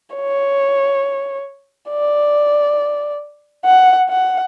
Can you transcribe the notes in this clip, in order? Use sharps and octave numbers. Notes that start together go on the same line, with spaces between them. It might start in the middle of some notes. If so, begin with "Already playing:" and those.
C#5
D5
F#5
F#5